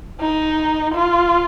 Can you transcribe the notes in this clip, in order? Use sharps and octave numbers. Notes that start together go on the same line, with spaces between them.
D#4
F4